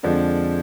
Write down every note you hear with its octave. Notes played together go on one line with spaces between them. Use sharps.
F2 D3 F3 G#3 D4